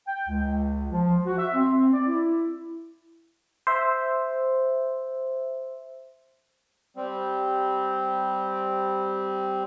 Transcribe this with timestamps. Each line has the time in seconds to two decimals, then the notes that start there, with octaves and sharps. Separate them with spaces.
0.08 G5
0.29 C#2
0.92 F3
1.26 F#4
1.38 E5
1.55 C4
1.93 D5
2.07 E4
3.67 C5 E5
6.97 G3 C4